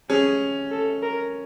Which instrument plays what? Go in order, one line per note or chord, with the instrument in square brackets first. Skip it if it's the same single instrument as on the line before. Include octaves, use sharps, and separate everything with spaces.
[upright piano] C#4 [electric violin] G#4
[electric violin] A4
A#4